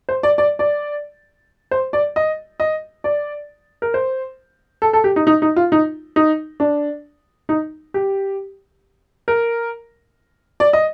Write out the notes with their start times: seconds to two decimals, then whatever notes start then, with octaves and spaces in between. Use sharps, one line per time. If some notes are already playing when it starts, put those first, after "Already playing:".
0.09 C5
0.23 D5
0.38 D5
0.59 D5
1.71 C5
1.93 D5
2.16 D#5
2.60 D#5
3.04 D5
3.82 A#4
3.94 C5
4.82 A4
4.93 A4
5.04 G4
5.16 D#4
5.27 D#4
5.42 D#4
5.56 F4
5.72 D#4
6.16 D#4
6.60 D4
7.49 D#4
7.94 G4
9.28 A#4
10.60 D5
10.73 D#5